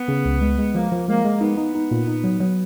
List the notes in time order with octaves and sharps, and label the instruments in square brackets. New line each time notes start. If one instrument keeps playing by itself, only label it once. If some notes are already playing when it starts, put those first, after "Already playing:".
Already playing: [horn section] B3
[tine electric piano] C#3
C#2
G#3
G#3
[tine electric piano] F3 [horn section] A#3
[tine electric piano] F3
[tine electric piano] G#3 [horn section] A#3
[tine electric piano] G#3
[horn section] B3 [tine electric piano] D#4
[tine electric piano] D#4
D#4
A#2
D#4
F#3
F#3